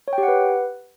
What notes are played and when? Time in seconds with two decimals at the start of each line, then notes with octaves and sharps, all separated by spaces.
0.08 C#5
0.13 G5
0.18 G4
0.23 F#5
0.28 B4